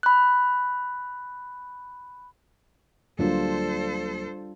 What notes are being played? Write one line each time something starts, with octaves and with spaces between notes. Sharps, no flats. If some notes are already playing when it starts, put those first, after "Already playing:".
B5 F#6
D2 F#3 G3 A#3 D4 F4 A4 C5